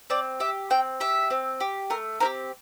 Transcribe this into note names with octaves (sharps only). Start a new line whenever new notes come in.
C4 D5
G4 E5
C4 G5
G4 E5
C4
G4
A3 A#4
C4 E4 G4 A#4